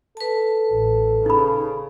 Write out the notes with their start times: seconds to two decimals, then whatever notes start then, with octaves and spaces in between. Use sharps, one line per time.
0.17 A4 B4 A5
0.73 A1
1.26 C#3 D#4 B5